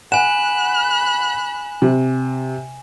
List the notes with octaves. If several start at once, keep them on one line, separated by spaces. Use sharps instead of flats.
F#5 G#5 B5 F#6 E7
C3